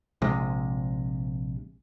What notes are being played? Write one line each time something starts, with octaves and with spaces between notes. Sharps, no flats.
A#1 C3 G#3